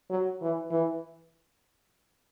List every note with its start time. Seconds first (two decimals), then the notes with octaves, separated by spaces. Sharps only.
0.10 F#3
0.41 E3
0.71 E3